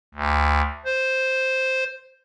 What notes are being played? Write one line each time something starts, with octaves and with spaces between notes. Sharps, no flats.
D2
C5